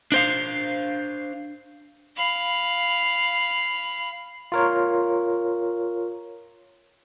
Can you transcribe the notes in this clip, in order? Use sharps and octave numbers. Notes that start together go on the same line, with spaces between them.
D4 C5 F5
F5 B5
F4 A#4 C#5